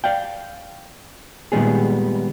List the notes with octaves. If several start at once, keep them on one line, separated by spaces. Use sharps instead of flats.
D5 F5 G5
A#2 D#3 G3 G#3 B3 G#4